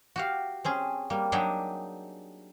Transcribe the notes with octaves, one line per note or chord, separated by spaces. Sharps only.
F#4 G4 F5
C4 C#4 G#4
G3 A#3
F#3 D4 D#4 G4 G#4 G5